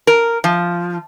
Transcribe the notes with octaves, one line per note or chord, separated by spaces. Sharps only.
A#4
F3